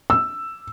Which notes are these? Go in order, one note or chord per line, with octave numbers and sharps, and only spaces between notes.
E6